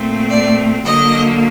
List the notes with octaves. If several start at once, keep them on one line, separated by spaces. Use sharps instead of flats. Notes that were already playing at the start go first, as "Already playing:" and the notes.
Already playing: A#2 A3 C4
D5
D3 F#3 A#3 D#5